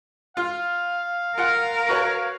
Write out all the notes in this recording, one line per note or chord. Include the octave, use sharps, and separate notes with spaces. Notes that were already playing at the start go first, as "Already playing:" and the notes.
F4 F5
F4 A#4 F#5
F#4 B4 C#5